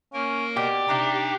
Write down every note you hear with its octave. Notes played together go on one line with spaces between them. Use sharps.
A#3 C#4 A#4
B2 G4 D5
C3 D4 D#4 A#5